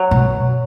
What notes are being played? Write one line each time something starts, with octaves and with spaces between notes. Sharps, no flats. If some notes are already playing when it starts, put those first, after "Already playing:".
Already playing: F#3
B2